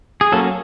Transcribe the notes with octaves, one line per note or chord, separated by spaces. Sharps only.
G#4
F#3 A#3 C#4 A4